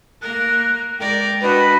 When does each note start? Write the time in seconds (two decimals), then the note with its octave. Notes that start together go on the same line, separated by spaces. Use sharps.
0.22 A#3 A#4 F#6
0.98 G#3 A#4 D5 G5
1.42 D4 F#4 B4 D#5